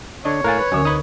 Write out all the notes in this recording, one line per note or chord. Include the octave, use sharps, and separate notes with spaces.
D3 D4 C#5 D#5
A2 A#4 F5 G#5 F#6 A6
B4
D2 D3 F#3 C#4 A#4 E5
D#4 B4 B5 D#6